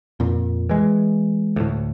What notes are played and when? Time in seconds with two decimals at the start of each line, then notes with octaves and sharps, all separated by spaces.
0.20 F2 A#2
0.69 E3 G#3
1.56 D2 A2